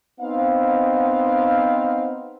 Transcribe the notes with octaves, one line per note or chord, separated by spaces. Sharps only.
B3 C4 D#4 F5